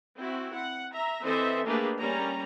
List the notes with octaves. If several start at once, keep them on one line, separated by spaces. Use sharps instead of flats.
C4 E4 F#4
F#5
E5 A#5
E3 C4 A4 C5 D#5 E5
A3 A#3 D4 G4 G#4 B4
G3 A#3 C#4 A#5